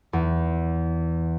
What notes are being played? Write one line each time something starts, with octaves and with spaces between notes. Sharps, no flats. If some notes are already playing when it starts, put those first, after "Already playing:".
E2